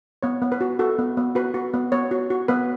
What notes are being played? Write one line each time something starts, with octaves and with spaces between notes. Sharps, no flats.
B3 C#5
B3
B4
F#4
F#4 A4
B3
B3
F#4 B4
F#4
B3
B3 C#5
F#4
F#4
B3 B4